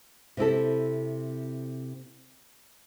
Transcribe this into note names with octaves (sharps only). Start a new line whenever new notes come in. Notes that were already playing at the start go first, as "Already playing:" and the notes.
C3 C4 E4 A4